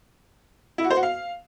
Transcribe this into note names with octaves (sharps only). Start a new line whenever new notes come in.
E4
F#4
C5
F#4
F5